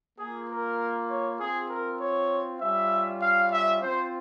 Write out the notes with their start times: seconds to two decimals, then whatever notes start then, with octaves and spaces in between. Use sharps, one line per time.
0.19 A#3 F4 G#4
0.49 A#4
1.10 C#5
1.40 C4 F4 G#4
1.70 A#4
2.01 C#5
2.61 G3 C#4 F4 E5
3.22 F5
3.52 E5
3.82 C4 F4 C5